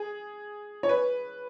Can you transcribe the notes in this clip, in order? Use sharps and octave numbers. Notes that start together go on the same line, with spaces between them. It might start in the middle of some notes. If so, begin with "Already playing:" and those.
Already playing: G#4
C#5
B4